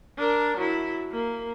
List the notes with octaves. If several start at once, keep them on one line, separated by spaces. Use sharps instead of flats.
D4 A#4
F#3 E4
A#3